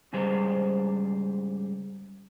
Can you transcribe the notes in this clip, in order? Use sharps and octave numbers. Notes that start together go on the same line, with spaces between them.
G#2 C#3 G3 G#4 C5